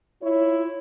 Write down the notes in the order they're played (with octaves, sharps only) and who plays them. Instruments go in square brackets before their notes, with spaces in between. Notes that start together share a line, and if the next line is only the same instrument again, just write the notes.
[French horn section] E4 F4 C#5